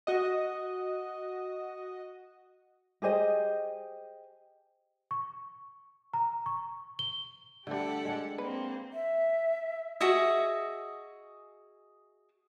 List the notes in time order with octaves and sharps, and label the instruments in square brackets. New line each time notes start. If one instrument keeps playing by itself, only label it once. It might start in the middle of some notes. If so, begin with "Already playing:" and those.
[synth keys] F#4 D#5
[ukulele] G4 G#4 C5 D#5
[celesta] C#6
A#5
C#6
G7
[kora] D3 [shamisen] G3 A3 [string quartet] G4 A4 F#5
[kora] G#3 D4
[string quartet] A#3 C4 [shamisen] B4
[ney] E5
[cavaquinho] F#4 G#4 D#5 E5